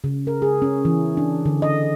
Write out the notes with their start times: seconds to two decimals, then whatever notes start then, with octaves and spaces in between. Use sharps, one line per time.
0.04 C#3
0.27 A#4
0.42 G#4
0.62 C#4
0.85 E3
1.17 D4
1.46 D3
1.62 D#5